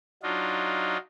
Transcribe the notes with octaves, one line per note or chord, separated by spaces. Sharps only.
F#3 D4 D#4 F4